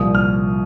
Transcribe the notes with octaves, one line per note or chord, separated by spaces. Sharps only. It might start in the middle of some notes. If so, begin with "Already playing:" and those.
Already playing: C2 A#2 F3 D#6
F6